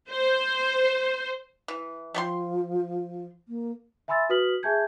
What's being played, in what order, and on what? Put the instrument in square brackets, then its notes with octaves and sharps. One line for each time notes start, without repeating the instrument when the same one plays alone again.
[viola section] C5
[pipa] E3
[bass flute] F3 [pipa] A3 G5 C6
[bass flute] A#3
[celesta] E5 G#5 B5 C6 E6 A6
F#4 B4 D#6 F6 B6 F#7
G#4 E5 G#5 A5 G6 G#6